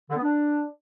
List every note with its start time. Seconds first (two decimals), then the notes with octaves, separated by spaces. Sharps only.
0.10 D3
0.16 B3
0.23 D4